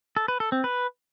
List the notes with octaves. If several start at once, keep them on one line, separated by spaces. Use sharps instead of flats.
A4
B4
A4
C4
B4